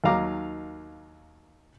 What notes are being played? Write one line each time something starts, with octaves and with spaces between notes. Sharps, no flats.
D#2 D#3 F#3 F5 A#5 D6